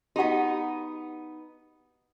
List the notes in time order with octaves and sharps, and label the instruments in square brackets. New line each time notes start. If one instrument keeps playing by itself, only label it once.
[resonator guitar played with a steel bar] B3 D#4 [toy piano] F#4 G4 F#5